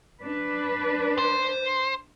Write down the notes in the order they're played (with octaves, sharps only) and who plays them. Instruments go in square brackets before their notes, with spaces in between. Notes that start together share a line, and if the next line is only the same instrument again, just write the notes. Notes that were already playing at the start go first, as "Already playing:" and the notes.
[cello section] D4 B4
[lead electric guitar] C5